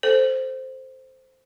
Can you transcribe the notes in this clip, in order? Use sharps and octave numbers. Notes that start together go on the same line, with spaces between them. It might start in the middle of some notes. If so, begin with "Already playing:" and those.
A4 C5